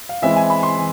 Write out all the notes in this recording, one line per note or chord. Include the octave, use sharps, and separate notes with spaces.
F5
E3 G#3 C4 E4 E5
G#5
B5
C6
E3